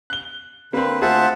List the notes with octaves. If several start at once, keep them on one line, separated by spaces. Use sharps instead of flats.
F#6 G7
D3 A#3 C4 B4
D2 F4 G#4 C5 E5 F#5 A5